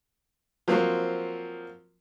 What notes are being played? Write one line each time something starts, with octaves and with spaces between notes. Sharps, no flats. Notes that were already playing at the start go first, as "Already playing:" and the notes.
F3 F#3 A#3 C4